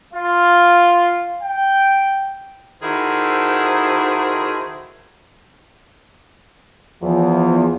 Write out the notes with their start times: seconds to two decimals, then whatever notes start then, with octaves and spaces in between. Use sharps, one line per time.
0.13 F4
1.41 G5
2.82 D#3 E4 F#4 G#4 A4 C5
7.03 E2 F3